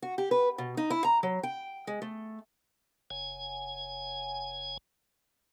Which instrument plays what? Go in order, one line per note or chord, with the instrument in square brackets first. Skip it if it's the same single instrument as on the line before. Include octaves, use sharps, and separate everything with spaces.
[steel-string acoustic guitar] F#4
G4
B4
B2
D#4
E4
A#5
F#3
G5
G#3
A3
[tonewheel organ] F#1 G#5